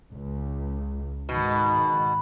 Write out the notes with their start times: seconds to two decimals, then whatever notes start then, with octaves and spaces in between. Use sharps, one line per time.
0.11 C#2
1.29 G#2 B2 D#3